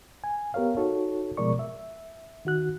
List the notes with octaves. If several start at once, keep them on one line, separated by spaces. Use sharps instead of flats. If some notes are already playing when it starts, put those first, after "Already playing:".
G#5
B3 G4 A#4 C#5 F5
D#4 F#4 A4 C#5
B2 F3 G#3 A#4 D5 C#6
E5
D#3 F#4 F#6